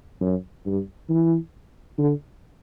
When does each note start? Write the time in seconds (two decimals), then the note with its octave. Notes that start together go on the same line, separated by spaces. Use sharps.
0.21 F#2
0.66 G2
1.09 E3
1.98 D3